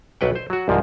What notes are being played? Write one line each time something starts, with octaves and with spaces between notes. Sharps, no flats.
B1 F#3 B4 F#5 G5
C5
F#3 F#4
C2 G#2 F3